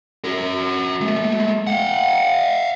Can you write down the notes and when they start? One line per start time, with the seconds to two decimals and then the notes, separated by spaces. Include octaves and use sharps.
0.24 F#4 A#4
1.01 G#3 A3
1.67 F5 F#5